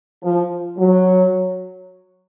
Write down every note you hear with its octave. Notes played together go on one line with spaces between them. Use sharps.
F3
F#3